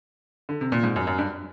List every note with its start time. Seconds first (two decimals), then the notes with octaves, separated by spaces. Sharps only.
0.49 D3
0.61 C3
0.72 A#2
0.83 G#2
0.96 F#2
1.07 F#2
1.18 G2